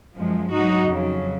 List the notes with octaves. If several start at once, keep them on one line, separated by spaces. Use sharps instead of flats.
F#2 F3 G#3
G#2 F#3 D#4 F#4
F2 C#3 F#3